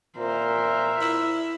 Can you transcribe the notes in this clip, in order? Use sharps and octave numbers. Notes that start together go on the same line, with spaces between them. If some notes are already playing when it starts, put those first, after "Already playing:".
A#2 A#4 C5 E5
E4